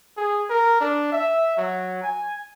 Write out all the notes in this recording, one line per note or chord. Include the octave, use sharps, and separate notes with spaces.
G#4
A#4
D4
E5
F#3
G#5